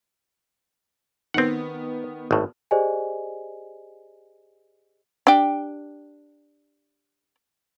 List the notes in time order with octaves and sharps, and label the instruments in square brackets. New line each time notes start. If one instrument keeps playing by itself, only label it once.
[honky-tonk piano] D#3 B3 [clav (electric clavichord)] C4 F#5
[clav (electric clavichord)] G#1 A2
[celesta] G4 G#4 C5 D5 D#5 G#5
[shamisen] D4 G4